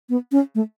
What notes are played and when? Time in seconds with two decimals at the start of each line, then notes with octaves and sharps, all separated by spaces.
0.09 B3
0.32 C#4
0.55 A3